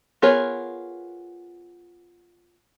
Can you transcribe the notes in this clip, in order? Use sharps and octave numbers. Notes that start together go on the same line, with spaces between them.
B3 F4 G#4 A#4 C#5